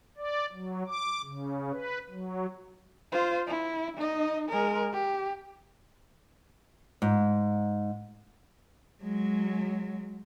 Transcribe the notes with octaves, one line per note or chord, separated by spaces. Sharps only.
D5
F#3
D6
C#3
B4
F#3
F4 C5
E4
D#4 D#5
G#3 A#4
G4
G#2
F#3 G#3